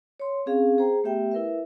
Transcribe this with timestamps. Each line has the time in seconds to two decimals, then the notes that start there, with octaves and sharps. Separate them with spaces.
0.20 C#5 C6
0.46 C4 C#4 G#4 F5
0.78 G#4 C5 G5 A#5
1.04 A3 B3 G4 E5 G5
1.31 E4 A#4 B4 E5